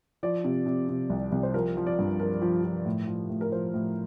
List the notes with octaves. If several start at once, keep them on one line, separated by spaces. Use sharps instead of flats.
F3 D5
C3
C3
C3
C2
C2
C5
F3 A#4
F3
D5
G2
F3 A#4
F3
F3
A2
F3
A2
A#4
F3 C5
A2